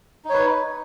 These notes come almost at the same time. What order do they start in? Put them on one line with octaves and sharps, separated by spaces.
D#4 C#5 B4